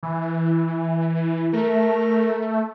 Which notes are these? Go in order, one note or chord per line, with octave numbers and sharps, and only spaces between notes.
E3
A3 A#4